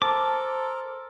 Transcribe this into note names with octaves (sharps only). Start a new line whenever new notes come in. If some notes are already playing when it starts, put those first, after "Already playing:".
A4 A#4 C5 A5 D6